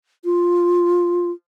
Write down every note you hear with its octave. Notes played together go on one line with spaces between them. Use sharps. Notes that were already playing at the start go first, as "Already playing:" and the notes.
F4